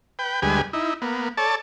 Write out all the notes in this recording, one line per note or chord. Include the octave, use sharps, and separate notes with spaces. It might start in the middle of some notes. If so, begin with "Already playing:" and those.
B4 G5
D2 G3 G#3 B4 G#5
D#4 E4
A#3 B3
A4 C#5 D5 A5